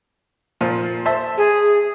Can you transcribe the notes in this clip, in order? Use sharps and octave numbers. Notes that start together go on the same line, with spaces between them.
A#2 F3
C5 E5 A5
G#4